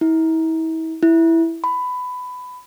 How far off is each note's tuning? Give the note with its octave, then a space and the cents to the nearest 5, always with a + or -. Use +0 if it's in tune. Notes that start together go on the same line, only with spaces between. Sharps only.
E4 -40
E4 +0
B5 +15